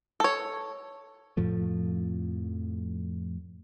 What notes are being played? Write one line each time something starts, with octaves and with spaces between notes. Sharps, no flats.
A4 C#5
F2 A2 F3 A3